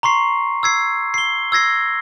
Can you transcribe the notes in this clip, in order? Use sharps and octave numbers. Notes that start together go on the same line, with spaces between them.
A#5 C6 C#6 C7
E6 G#6 C7
C7 G7
E6 G#6 A#6 C7